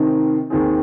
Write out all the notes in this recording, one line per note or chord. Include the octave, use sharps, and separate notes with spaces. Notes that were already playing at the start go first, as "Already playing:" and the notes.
Already playing: C3 D#3 C4 D#4
D#2 D#3 C4 G#4